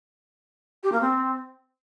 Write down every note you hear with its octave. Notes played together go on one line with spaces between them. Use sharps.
G4
A#3
C4